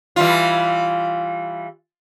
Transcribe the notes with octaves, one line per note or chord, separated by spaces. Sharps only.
E3 G3 F4